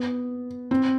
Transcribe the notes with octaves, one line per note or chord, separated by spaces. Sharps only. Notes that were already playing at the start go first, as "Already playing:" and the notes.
Already playing: B3
C4